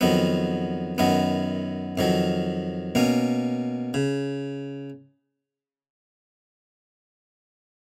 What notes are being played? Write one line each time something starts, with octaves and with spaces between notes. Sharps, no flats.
F2 D#3 F#3 B3
F#2 D#3 F#3 B3
F2 D#3 F#3
B2 A#3 C#4
C#3